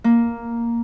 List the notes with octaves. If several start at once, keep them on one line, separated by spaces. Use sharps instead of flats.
A#3